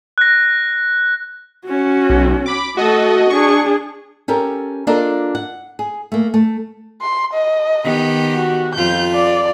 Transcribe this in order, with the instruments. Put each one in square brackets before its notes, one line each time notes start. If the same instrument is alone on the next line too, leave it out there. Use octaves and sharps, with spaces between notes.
[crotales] F#6 A#6
[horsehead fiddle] C#4 F#4
[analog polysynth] B1
B5 D6
[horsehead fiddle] A3 A4 [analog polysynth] F#4 D#5
[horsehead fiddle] D4 G#4 [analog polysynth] C#6
[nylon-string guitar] C#4 G4 A4 A#4
A#3 D4 F4 A4 A#4 D#5
F#5
G#4
A3 A#3
A3
[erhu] C6
D#5
[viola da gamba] D#3 B3 G4
[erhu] F#4
[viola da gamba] F2 F4 [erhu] G6
[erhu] D5